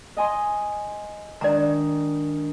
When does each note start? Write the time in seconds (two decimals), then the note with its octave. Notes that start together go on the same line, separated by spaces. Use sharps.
0.17 D#5 G#5 C6
1.41 D#3 G#3 D4 D5 A#5